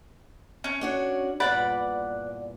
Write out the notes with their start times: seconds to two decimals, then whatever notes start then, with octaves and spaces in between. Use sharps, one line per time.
0.64 C#4
0.81 D4 F#4 C#5
1.40 E2 G2 A#2 D5 F#5 B5